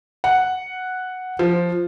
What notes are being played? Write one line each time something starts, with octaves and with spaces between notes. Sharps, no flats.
F#5
F3